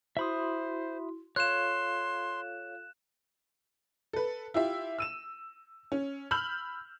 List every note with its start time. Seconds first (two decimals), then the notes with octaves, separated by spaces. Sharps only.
0.17 E4 F#4 C5 E5 B5 C6 D#6
1.36 F4 A4 C#5 F5 C6 F#6 E7
4.13 A4 B4
4.54 E4 F4 G4 E5
4.99 E6 D#7 E7
5.92 C#4
6.31 B5 E6 F6 G6 F#7